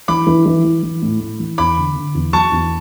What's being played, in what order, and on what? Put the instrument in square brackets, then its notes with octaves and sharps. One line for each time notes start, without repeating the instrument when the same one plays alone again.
[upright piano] E3 [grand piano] B5 D6
[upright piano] E3
E3
E3
E3
A2
A2
E3
[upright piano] E2 [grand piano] B5 D6
[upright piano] D3
D3
E2
[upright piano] F#3 [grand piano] A5 C#6
[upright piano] E2